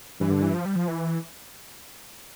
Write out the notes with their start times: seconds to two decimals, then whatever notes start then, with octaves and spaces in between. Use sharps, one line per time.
0.20 G2 E3
0.31 D3
0.42 E3
0.54 F3
0.66 G3
0.76 F3
0.88 E3